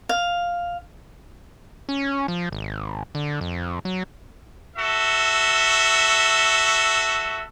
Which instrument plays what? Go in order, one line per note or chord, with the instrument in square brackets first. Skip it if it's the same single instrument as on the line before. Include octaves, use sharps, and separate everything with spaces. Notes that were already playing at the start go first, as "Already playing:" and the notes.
[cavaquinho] F5
[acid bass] C#4
F3
G#1
D3
F2
F#3
[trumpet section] F#4 A4 E5